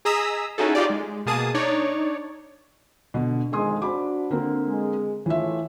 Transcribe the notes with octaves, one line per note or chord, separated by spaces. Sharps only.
G#4 D#5 A#5 D#6 E6 B6
C#4 D#4 E4 F#4 G#4 A4
D#4 F4 G4 D5
G#3
B2 A#3 G#4 A5 D#6
D4 D#4 C#5 D5
B2 D3
F2 D#3 G#3 G#5 C6 D#6
D4 F#4 C5 B5 D6
D3 A#3 C4
G#3
A2 E3 F4 E5